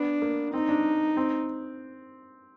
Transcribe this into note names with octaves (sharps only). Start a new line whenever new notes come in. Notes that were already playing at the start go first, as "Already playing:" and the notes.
Already playing: B3 D4
A#3
C4 D#4
D4
C4